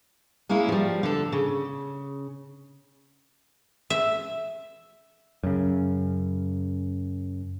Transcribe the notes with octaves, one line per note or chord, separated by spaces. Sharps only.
G#3 A#3 C#4 E4
F3 G3
D3 A4
C#3
E5
F#2 C#3